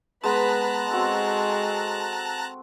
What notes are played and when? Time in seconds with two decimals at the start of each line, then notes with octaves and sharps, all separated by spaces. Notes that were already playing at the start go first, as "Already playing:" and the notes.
0.24 G#3 B3 B4 A5 A#5 F#6
0.91 G#3 C4 F#4 A4